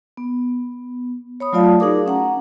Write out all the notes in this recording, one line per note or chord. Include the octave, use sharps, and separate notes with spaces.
B3
C#5 B5 D#6
F#3 A3 F4 D5 F5 A5
D#4 F#4 G#4 A#4 D6 D#6
C#4 F#5 A#5